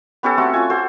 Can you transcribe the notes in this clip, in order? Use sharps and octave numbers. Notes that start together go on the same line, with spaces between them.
B3 C#4 G4 A4
A3 C4 F#4
C#4 F4 G#5
F#4 A4 C5